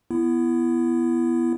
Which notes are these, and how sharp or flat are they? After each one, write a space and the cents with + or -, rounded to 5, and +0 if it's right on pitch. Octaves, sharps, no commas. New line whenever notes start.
B3 +0 E4 +25